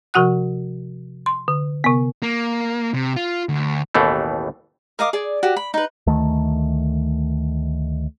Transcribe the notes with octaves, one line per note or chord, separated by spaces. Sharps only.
C3 F3 F#4 F#5 F#6
C6
D3
C3 B3
A#3
C3
F4
D2
A1 D#2 B2 E3 A3
A#4 D#5 F5 D6
G#4 D5
F#4 G4
B5
D#4 B4
D2 D#3 A3